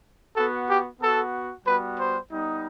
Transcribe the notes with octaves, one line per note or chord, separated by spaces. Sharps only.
B3 F#4 A4
G4
B3 F#4 A4
G3 B3 F#4 B4
C5
G3 B3 D#4